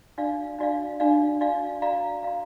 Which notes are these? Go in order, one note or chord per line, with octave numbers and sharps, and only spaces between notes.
D4 F#4 D5 F5
D4 F#4 D5 F5
D4 F#4 D5 F5
D4 F#4 D5 F5
F#4 D5 F5 A#5
F#4 D5 F5 A#5